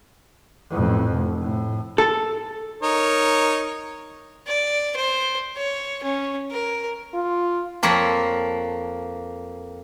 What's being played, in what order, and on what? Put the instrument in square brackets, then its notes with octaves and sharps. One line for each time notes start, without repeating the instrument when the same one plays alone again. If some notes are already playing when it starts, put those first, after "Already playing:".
[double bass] A1 F2
F1
A2
[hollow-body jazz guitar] A4
[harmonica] D#4 A#4 C#5
[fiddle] D5
C5
C#5
C#4
A#4
[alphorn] F4
[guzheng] F2 A#3 A4 C#5 B5